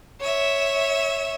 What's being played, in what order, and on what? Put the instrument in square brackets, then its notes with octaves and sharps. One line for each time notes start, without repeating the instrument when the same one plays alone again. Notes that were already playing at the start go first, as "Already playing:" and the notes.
[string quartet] C#5 E5